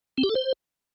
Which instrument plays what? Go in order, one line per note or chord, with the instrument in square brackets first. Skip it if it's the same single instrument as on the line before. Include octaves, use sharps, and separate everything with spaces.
[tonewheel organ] C4
G4
A4
C5